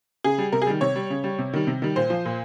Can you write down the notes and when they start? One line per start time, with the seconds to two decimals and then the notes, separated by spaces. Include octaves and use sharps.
0.24 C#3 G#4
0.38 G3
0.52 C3 A#4
0.62 G#4
0.67 D#3 G3
0.81 C3 C#5
0.96 G3
1.10 C#3
1.24 G3
1.39 C3
1.53 D#3 G3
1.67 C3
1.82 D#3 G3
1.96 A#2 C5
2.10 F3
2.25 A#2